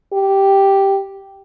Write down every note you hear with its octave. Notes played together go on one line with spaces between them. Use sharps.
G4